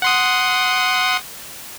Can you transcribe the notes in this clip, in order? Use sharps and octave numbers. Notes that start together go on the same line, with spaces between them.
F#5 C6 D#6